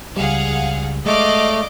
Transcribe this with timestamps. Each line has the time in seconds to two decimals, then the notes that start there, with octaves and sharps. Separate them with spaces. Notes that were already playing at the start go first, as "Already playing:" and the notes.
0.17 C#2 G3 G#4 F5 F#5
1.06 G#3 A3 D5 D#5 F5 D6